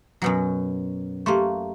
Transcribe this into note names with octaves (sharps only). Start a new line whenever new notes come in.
F#2 B2 F#3
A3 A#3 G4 C6 C#6